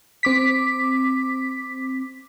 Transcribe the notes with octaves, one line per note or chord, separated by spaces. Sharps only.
C4 D6 B6